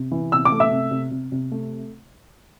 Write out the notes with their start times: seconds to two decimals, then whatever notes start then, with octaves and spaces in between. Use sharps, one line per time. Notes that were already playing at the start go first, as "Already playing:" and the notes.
Already playing: C3
0.12 E3
0.32 C3 E6
0.45 D6
0.52 A3
0.60 E5 E6
0.71 C3
0.91 C3
1.11 C3
1.32 C3
1.52 A3